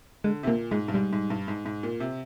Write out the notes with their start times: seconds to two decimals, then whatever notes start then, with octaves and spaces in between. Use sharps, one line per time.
0.24 D3 G#3
0.43 C3
0.47 A#2 A#3
0.71 G#2 G#3
0.88 G2
0.94 G#2 G3
1.13 G#2
1.30 G2
1.48 G#2
1.66 G#2
1.83 A#2
2.00 C3